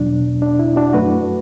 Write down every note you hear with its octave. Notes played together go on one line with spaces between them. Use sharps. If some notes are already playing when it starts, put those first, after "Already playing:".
Already playing: E2 B2 F#3 D4
D4
E4
D4 F#4
F#2 F#3 A3 F#4 B4